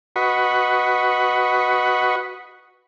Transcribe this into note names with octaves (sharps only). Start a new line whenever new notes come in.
F#4 B4 D#5 F#5 B5 C#6